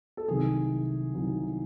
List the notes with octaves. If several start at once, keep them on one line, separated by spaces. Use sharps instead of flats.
A4
C2 C3 D#3 F#3 G#4
C2 C3 D#3 F#3